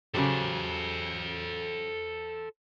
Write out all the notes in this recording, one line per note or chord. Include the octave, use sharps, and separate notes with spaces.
C#3 F#3 G4 A4 C5